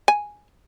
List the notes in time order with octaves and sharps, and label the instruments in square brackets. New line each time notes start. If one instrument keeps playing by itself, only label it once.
[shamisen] G#5